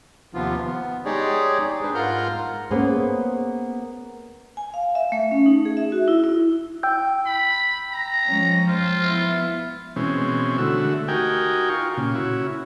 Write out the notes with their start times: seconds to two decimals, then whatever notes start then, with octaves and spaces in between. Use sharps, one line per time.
0.34 D#2 C3 F3 B3 F4
0.64 B3
1.05 G#3 D#4 G4 G#4 C#5 D5
1.82 D4 B4 C5
1.95 G#2 F4 A#4 F#5 F6 G6
2.71 A#3 B3 C#4 G#4 B4 C5
4.57 G#5
4.74 F5
4.95 E5
5.12 A3
5.31 C#4
5.46 D#4
5.65 G#4
5.77 E5
5.92 F#4
6.08 E4
6.24 E4
6.83 G5 E6 G6
7.26 B5
7.92 A#5
8.26 F3 G#3 C#4
8.68 F3 G#3 F4 C5
9.01 B3 E4
9.96 B2 E3 G#3 C4 C#4
10.58 D3 A3 F#4 E5
11.08 D#4 F#4 G4 A#4 G5 G#5
11.69 F4 C#6
11.97 A#2 C#3
12.15 C#4 E4 F#4